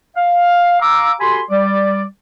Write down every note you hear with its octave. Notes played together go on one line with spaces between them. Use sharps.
F5
F5 A#5 D6 E6
F#4 G4 A4 G#5 B5 C6
G3 D5